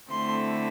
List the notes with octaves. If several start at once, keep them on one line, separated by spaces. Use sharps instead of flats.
D3 A3 C4 E4 C6